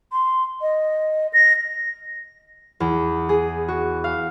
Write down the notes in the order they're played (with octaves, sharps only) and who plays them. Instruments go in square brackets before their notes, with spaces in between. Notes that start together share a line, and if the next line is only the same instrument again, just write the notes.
[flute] C6
D#5
A#6
[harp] E2
G#4
F#4
F5